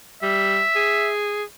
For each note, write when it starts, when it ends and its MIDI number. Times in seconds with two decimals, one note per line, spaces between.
0.23 0.62 55
0.23 1.11 76
0.76 1.44 68